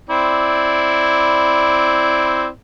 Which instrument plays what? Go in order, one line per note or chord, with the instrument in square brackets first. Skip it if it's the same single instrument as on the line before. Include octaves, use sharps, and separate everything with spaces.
[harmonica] C4 E4 D5